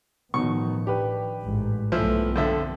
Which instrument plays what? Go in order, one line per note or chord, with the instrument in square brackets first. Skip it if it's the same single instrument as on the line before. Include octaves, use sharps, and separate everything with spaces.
[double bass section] A1 D#3 F3 [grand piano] B2 D#4 [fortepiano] C#6
[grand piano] D4 G4 B4
[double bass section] A1 G#2
[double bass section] B1 G2 A3 [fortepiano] E3 F3 E4
[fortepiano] F2 D3 E5 [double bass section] C4